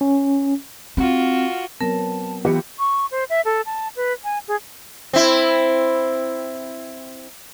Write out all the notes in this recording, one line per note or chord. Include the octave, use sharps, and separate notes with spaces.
C#4
C4 F4 F#4
F#3 B3 C4 A#4 A5
E3 F#3 B3 F4 G4 G5 C#7
C#6
C5
E5
A4
A5
B4
G#5
G#4
C4 E4